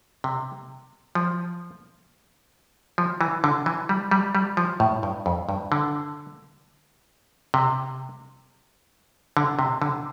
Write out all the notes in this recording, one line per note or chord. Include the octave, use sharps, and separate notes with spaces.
C3
F3
F3
E3
D3
E3
G3
G3
G3
F3
A2
G2
F2
G2
D3
C3
D3
C3
D3